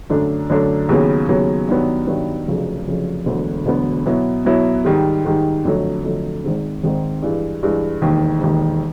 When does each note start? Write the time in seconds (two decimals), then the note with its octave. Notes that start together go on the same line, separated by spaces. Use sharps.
0.10 F#2 D3 F#3 A3 D4
0.50 F#2 D3 F#3 A3 D4
0.89 D#2 C#3 F#3 B3
1.29 D#2 C#3 F#3 B3
1.69 G2 D#3 F#3 B3
2.07 G2 D#3 F#3 B3
2.48 F1 F2 C#3 F#3
2.87 F1 F2 C#3 F#3
3.26 E1 D2 D3 F#3 B3
3.66 E1 D2 D3 F#3 B3
4.06 B2 F#3 B3 E4
4.45 B2 F#3 B3 E4
4.85 G#2 D#3 G3
5.25 G#2 D#3 G3
5.65 F2 D3 F#3 A3
6.03 F2 D3 F#3 A3
6.44 G#1 G#2 D#3 G#3 C4
6.84 G#1 G#2 D#3 G#3 C4
7.23 G2 E3 G#3
7.63 G2 E3 G#3
8.01 E1 D#2 D#3
8.41 E1 D#2 D#3